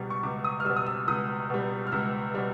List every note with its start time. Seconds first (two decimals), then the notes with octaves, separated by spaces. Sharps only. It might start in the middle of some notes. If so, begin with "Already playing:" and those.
Already playing: C#2 B2 G3
0.10 C#6
0.23 C#2 D6
0.44 D#6
0.60 F6
0.65 B2 G3 E6
0.76 D#6
0.86 E6
1.08 C#2 D#6
1.50 B2 G3
1.87 F6
1.92 C#2 E6
2.34 B2 G3